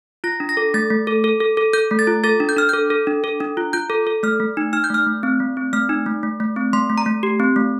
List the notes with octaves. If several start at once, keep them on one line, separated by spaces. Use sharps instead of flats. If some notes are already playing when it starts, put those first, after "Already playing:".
F4 A#6
D4
A#6
A4
A3 A6
A3
A4
A4
A4
A4
A4 G6
A3
A6
F4
A4 A6
D4
G6
D4 F6
A4 G6
A4
D4
A4
D4
F4
F4 G6
A4
A4
A3 F6
A3
D#4
D#4 F6
G6
A3 F6
A3
C4
A3
C4
A3 F6
D#4
A3
A3
A3
C4
A3 C6
A3
A#5
A3
G4
C4
A3